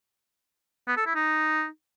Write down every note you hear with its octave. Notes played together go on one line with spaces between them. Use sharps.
B3
A4
E4
D#4